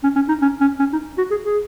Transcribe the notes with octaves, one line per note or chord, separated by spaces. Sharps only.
C#4
C#4
D#4
C#4
C#4
C#4
D#4
F#4
G#4
G#4